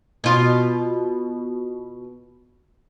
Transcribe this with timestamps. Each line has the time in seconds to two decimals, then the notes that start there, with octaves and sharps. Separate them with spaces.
0.24 B2 F4